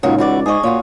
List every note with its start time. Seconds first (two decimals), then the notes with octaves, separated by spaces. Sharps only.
0.03 C#2 A#2 C#3 D#4 F#4 C#5
0.18 E3 F#4 D5
0.46 G#2 G#4 D#5 C#6 D#6
0.63 A#2 C#4 F4 F#4